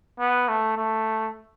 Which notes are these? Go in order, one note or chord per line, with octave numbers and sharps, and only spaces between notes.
B3
A3
A3